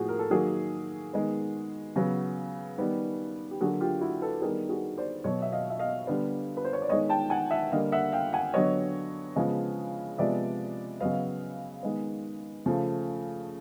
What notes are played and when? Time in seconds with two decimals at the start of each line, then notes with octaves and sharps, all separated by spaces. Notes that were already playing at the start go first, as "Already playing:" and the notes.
Already playing: A2 F3 A#3 F#4 G#4
0.08 A#4
0.19 A4
0.30 D#3 F#3 A#3 F#4 G#4
1.14 D#3 G#3 B3
1.96 C#3 F#3 B3
2.78 D#3 G3 B3
3.51 G4
3.61 D3 F#3 A#3 F#4 G#4
3.80 F4 G4
4.01 E4 F#4
4.22 A4 B4
4.42 D#3 G3 B3 G#4 A#4
4.69 F#4 G#4
4.98 C5 D5
5.24 B2 F#3 B3 C#5 D#5
5.42 E5
5.52 D#5 F5
5.70 E5
5.79 D#5 F5
6.07 D3 G3 B3
6.57 B4
6.65 C5
6.73 C#5
6.82 D5
6.89 D#3 G#3 B3 C#5 D#5
7.09 G5 A5
7.30 F#5 G#5
7.51 E5 F#5
7.72 D3 G3 A#3 D#5 F5
7.92 E5 F#5
8.12 F5 G5
8.33 F#5 G#5
8.54 D3 F#3 B3 C#5 D#5
9.36 C#3 F3 G#3 B3
10.18 C3 F3 G#3 B3 D5 E5
11.00 C#3 F#3 B3 D#5 F5
11.83 D#3 G#3 B3
12.66 C#3 F3 A3